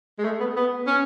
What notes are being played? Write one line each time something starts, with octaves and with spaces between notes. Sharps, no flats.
G#3
A3
B3
B3
C#4